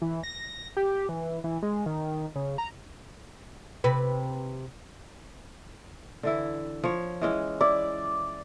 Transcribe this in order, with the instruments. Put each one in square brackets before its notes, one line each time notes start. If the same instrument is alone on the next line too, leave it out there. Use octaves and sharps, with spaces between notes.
[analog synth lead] E3
A#6
G4
E3
E3
G#3
D#3
C#3
A#5
[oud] C3 B4
[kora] D3 E3 E4
F3 C#5
E3 G#3 C#4
[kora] E4 [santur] D5